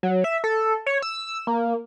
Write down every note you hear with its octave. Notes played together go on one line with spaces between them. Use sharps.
F#3
E5
A4
C#5
E6
A#3